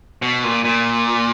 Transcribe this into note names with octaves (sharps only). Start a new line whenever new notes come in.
B2
A#2
A#2